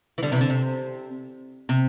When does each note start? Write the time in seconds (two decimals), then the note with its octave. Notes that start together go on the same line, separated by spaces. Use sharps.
0.18 E3
0.23 D3 G3
0.32 C3 E3
0.41 D3
0.50 C3
1.69 C3